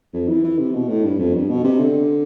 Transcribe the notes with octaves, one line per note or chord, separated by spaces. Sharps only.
F2
E3
E3
C3
B2
A2
G2
F2
G2
B2
C3
D3